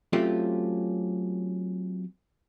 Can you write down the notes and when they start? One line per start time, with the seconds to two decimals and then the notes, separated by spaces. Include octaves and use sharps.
0.13 F#3 A3 C4 C#4 F4 G4